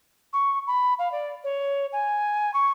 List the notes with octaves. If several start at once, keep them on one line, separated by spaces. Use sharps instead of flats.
C#6
B5
F5
D5
C#5
G#5
C#6